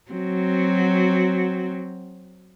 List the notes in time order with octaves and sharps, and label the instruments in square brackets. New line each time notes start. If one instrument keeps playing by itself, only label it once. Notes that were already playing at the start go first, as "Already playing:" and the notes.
[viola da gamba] F#3 C4 F#4